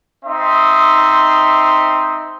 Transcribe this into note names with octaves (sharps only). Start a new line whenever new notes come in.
C4 D#4 E5 C6